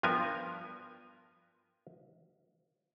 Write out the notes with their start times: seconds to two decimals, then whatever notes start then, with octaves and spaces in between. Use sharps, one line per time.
0.03 G2 F3 B3 A#4 G#5